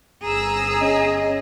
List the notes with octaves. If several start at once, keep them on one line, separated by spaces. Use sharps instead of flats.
G1 G#4 A#5 E6
C#4 D#5